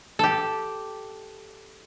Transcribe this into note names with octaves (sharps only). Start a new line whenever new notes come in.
G4 A4